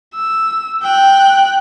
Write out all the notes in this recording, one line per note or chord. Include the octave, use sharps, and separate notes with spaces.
E6
G5 F#6